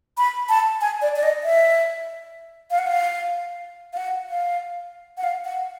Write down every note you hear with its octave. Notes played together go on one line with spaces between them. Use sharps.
B5
A5
G#5
D5
D5
D#5
E5
F5
F#5
F5
F5
F#5
F5
F#5
F5
F#5